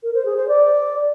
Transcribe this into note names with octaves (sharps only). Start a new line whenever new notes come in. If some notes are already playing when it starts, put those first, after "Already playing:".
A#4
C5
G#4
C5
D5